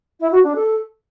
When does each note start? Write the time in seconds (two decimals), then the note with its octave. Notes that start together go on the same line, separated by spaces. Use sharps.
0.19 E4
0.31 F#4
0.43 D4
0.55 A4